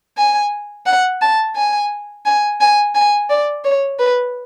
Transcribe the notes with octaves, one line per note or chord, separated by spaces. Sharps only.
G#5
F#5
A5
G#5
G#5
G#5
G#5
D5
C#5
B4